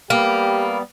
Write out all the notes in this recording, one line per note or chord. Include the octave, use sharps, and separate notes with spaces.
G3 A#3 B3 G4